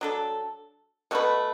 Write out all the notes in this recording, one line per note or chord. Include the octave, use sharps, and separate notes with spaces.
F#3 D4 A4
B2 A3 F#4 B4